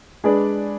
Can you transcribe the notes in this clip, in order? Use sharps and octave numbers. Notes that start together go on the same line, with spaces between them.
G#3 D4 G#4 B4 D5